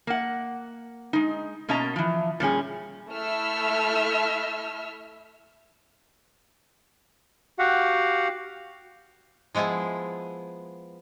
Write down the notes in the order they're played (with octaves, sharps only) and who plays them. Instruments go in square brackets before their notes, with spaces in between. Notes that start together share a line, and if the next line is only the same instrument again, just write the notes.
[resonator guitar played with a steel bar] A#3 F#5
G#3 D#4
B2 A#3 C#4 D#5 A5 A#5
E3 F3
A#2 G3 C#4 G#4
[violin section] A3 E4 A4 E5 E6 F6
[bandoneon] F#4 G4 F5 F#5
[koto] F3 G#3 B3 E4 G#4